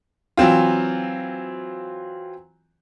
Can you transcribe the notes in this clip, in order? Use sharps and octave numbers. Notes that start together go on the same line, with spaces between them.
E3 F#3 C4 F4